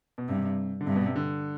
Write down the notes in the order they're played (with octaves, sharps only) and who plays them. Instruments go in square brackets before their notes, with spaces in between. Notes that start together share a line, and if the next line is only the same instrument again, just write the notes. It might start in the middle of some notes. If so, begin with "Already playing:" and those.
[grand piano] B2
[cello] G2 [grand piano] C3
[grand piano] D3
[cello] G2 [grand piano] C3
[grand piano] B2
C3
D3